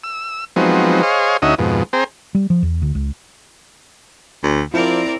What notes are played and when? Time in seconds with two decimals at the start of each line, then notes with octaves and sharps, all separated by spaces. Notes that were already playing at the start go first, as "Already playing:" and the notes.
0.04 E6
0.56 F3 F#3 G#3 B3 C4 D#4
1.03 G#4 C5 C#5 D#5 F5
1.42 D2 C#4 D#4 F#4 D#5 E5
1.58 F2 G#2 B2
1.93 C4 G#4 C5 G5 A#5
2.35 G3
2.50 F3
2.63 E2
2.82 D2
2.95 C#2
4.43 D2
4.74 F3 C4 E4 A#4 D5